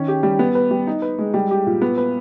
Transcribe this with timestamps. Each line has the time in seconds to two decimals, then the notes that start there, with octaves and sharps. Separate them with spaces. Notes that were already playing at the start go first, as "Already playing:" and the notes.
Already playing: D#3 C#4
0.08 G4
0.23 G3
0.39 B3
0.55 B4
0.71 G3
0.87 D#4
1.02 B4
1.19 G#3
1.34 G3
1.51 G4
1.66 A#2
1.82 B3
1.98 B4